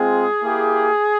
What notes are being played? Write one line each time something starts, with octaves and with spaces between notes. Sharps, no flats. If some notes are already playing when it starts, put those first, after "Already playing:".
Already playing: G#3 C4 F4 G#4
A#3 E4 G4